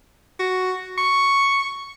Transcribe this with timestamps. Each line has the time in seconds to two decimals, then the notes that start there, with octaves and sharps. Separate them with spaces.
0.40 F#4
0.98 C#6